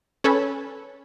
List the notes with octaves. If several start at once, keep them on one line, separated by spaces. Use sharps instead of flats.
C#4 A4 B4 C#5